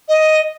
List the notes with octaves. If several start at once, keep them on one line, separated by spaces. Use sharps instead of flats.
D#5